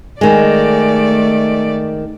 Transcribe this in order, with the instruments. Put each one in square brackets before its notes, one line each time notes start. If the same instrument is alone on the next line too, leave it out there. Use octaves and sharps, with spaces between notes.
[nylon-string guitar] D#3 G#3 [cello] A3 D5